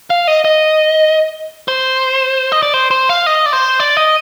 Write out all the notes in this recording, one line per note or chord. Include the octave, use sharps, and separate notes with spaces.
F5
D#5
D#5
C5
D#5
D5
C5
C5
F5
D#5
D5
C5
D5
D#5